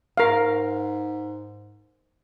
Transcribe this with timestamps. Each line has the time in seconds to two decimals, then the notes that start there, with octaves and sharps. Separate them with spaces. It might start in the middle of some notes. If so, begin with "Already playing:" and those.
0.17 G#2 A#4 F5